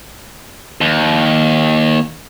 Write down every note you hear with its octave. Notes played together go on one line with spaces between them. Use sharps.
D#2